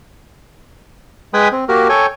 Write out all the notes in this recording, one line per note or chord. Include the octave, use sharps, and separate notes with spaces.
G#3 B4 G5 G#5 B5 D#6
C4
A#3 F#4 G4 A#4
A4 C#5 G5 G#5